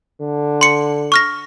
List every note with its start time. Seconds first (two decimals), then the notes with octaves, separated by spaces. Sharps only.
0.20 D3
0.61 C6 C#7
1.12 C#6 F6 A#6